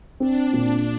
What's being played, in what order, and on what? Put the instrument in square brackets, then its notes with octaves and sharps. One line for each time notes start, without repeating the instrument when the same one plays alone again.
[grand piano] C4 [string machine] D4
[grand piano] A#2